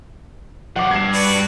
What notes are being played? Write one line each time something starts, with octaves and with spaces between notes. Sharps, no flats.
F3 F#3 F#5 D6
G2 G#6 C7 E7
F#4 B4 D5